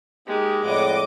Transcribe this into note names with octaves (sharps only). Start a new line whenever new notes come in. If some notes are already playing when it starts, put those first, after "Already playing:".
G#3 A#3 D#4 G4
F2 A2 B4 D5 D#5 F#5 D6